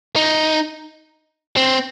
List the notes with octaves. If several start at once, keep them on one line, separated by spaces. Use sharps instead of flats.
D#4
C4